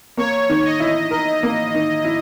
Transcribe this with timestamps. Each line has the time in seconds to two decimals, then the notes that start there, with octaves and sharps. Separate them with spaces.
0.17 A#3 C#5
0.49 D#3
0.65 D#5
0.80 E4
1.11 A#4 D#5
1.43 A#3
1.74 D#3
2.05 E4